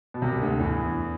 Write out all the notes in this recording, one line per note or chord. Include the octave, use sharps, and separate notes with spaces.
B2
C2 C3
D2 D3
E2 E3